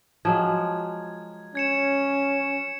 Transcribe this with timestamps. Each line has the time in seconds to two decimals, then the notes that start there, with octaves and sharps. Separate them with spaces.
0.25 F3 F#3 G#3 G#6
1.55 C#4 G#6 C#7 E7